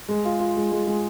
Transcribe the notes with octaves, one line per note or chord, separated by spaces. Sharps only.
G#3
F4
F4
G#3
G#3
G#3